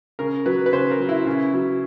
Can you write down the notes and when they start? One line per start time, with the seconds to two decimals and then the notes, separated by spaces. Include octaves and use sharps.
0.19 C#3 A#4
0.46 F#3 B4
0.66 B4
0.73 C#3 C5
0.91 A#4
1.00 F#3
1.09 E4
1.27 C#3
1.54 F#3